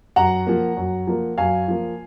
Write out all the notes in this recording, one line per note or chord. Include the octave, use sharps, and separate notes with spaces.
F#2 F#5 A#5
F3 A#3
F#2
F3 A#3
F#2 F5 G#5
F3 A#3